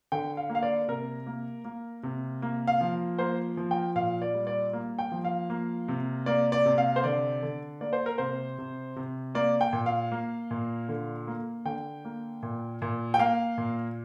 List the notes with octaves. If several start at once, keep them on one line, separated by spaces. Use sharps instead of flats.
D3 G5
F5
A#3
F5
D5
C3 A#4
A#3
A#3
C3
A#3
F5
F3
A#3 C5
F3
G5
A#2 F5
D5
G3
D5
A#3
G5
F3
F5
A#3
C3
A#3 D5
D5
C3
F5
C5
D3 D5
D3
A#3 D5
C5
A#4
C3 C5
C3
C3
A#3 D5
G5
A#2
F5
A#3
A#2
D3
A#3
D3 G5
A#3
A#2
A#2
G5
A#3 F5
A#2